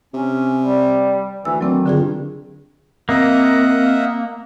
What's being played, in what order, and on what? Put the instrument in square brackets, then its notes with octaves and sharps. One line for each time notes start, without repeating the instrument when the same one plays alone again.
[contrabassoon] C3 [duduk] C#4
[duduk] G3
[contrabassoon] D2 [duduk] E3 [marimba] E6
[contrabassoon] D2 [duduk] D#3 [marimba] F#3 C4 D4
[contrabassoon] G2 [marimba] D3 F4 G#4
[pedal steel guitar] A#3 [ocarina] C4 [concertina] D#5 E5 F#5